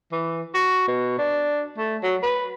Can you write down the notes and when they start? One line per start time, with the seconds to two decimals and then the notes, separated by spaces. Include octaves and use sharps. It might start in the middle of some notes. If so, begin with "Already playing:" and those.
0.12 E3
0.54 F#4
0.88 B2
1.19 D4
1.78 A3
2.03 F#3
2.23 B4